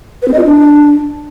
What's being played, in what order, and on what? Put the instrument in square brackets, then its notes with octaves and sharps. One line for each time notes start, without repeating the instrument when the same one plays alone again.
[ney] B4
C4
D#5
F4
D4